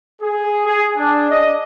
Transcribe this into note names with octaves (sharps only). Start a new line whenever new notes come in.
G#4
G#4
D4
D#5